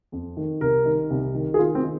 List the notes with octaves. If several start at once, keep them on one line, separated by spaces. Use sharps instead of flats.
F2
D#3
C2 A#4
D#3
C2
D#3
G#4
D#3 F4
C4
D#3